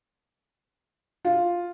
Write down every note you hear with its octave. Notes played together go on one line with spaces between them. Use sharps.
F4